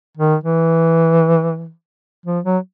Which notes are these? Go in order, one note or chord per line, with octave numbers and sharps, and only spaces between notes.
D#3
E3
F3
F#3